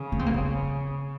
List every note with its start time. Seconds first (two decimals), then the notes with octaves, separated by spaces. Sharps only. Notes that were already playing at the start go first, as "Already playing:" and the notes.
Already playing: C#3
0.12 C#4
0.19 C4
0.26 A#3
0.34 C4